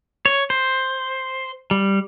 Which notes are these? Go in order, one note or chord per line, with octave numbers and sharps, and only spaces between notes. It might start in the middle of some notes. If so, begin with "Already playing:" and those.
C#5
C5
G3